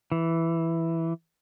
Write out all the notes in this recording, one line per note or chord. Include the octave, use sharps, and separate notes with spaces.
E3